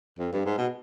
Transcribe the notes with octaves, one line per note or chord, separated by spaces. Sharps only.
F2
G2
G#2
B2